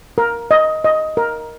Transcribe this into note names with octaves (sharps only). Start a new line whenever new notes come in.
A#4
D#5
D#5
A#4